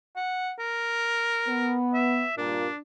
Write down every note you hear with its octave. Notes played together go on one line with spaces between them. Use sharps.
F#5
A#4
B3
E5
G2 A#2 D4